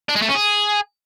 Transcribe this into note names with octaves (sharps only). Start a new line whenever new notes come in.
D4
G#3
A3
C#4
G#4